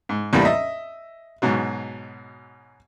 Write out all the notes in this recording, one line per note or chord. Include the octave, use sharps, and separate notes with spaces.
G#2
E2 A2 G3 A#3 D4 B5
D#5 E5
G#2 B2 F#3